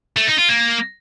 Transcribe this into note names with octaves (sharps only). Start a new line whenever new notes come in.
A3
D#4
F4
A#3